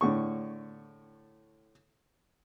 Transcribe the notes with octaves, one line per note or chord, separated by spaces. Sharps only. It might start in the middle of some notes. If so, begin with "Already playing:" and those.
A2 D3 C#6